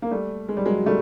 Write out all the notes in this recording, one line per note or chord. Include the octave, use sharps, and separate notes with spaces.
A#3
G3 A3
G#3
G3
F#3 G#3
G3 A3